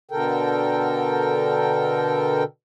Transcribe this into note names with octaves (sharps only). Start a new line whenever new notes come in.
B2 D3 A4 A#4 G5